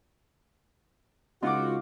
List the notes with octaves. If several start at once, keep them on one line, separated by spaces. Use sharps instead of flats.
C#2 D#4 F4 F#4 C6 D6